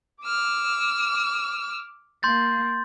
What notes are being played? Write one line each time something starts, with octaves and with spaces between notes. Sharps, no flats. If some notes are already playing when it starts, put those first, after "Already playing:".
D6 E6 F6
A#3 C6 G6 A6